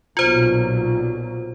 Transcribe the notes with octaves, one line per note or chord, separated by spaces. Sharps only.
B1 A#2 F#3 F4 C5